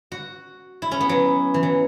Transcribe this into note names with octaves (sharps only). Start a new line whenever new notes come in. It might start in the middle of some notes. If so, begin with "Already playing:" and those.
F#4
E4
C#4
B3
F#3
E3
F#3